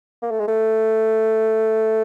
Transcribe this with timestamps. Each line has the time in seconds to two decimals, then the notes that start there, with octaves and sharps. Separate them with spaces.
0.22 A#3
0.31 A3
0.39 G#3
0.48 A3